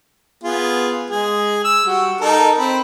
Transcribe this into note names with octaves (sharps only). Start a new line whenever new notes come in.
B3 F4 G#4
G#3 G#4
E6
G3 F#4
D#4 A4 A#4
C4 B5